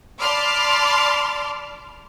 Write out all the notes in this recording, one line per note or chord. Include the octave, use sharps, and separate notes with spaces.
D5 A5 B5 C6 D6 F6